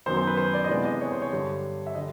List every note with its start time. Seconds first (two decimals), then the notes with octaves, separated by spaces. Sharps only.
0.06 F#2 D#3 F#3 B3 C5
0.17 C5
0.27 B4
0.37 C5
0.54 D5
0.64 D#5
0.69 C3 E3 G#3 B3 D4 D5
0.85 D#5
1.01 C#5
1.12 C5
1.22 C#5
1.32 G2 D3 G3 C#5
1.87 E5
1.95 D3 G3 D#5